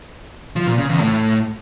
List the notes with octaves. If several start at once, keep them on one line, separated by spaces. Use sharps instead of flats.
F3
A#2
C#3
E2
A2